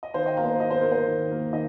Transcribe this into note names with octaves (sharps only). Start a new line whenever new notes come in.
D#5
D#3 C5 F5
D#5 G5
A#3 F5 A#5
C5
A#4
D#3 D#5
C5
A#3 A#4
C5
D#3
A#3
D#3 D#5